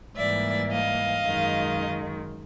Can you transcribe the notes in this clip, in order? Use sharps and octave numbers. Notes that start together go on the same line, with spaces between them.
G#2 E3 G3 A#3 D5 E5
D#5 F5
F#2 D#3 G#3